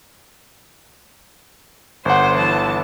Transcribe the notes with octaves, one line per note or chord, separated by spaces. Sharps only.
G1 C5 F#5
E3 A5